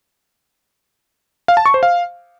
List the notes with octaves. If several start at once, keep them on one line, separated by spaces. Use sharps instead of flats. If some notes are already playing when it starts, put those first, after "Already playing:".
F5
A5
C#6
C5
F5